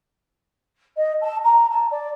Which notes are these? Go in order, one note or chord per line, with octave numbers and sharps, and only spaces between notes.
D#5
A5
A#5
A5
D5